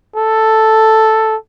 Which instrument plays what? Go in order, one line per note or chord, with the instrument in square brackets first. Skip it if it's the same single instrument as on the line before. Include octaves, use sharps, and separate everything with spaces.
[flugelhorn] A4